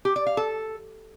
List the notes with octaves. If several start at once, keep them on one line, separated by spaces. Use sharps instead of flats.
G4
D5
F5
A4